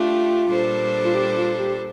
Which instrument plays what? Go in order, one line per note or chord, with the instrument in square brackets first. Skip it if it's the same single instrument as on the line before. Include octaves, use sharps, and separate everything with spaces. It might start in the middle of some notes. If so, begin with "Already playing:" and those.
Already playing: [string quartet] A3 D4 G4 [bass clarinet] F4
[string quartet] A#2 G3 D4 A4 C5
[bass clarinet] F4
G4
F4
G4